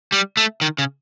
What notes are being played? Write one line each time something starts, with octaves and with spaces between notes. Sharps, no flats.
G3
A3
D#3
C#3